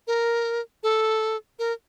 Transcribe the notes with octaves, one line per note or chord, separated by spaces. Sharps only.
A#4
A4
A#4